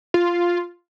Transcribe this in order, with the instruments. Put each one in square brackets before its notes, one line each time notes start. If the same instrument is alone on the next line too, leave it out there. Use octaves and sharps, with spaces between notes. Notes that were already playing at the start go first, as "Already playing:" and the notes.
[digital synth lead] F4